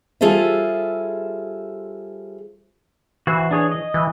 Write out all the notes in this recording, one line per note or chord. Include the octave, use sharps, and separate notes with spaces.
G3 F4 G#4 A4 C5 E5
E3 F#4 C5
D4 G#4 C#5
D#5
E3